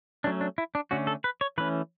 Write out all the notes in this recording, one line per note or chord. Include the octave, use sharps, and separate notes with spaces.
F#3 A3 C#4 D4
D4
E4
D4
D3 A3 C#4 F#4
A4
B4
C#5
E3 A3 C#4 B4